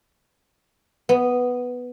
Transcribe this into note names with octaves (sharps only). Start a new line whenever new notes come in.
B3